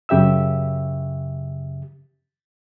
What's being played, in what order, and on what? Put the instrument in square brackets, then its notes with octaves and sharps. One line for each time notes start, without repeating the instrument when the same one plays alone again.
[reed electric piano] F#2 C#3 G4 E5 E6